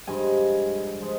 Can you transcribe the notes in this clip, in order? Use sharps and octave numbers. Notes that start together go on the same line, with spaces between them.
G2 F3 G#3 G#5
F3 G#3